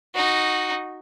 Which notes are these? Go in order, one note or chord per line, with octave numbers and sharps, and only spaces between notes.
D#4 F#4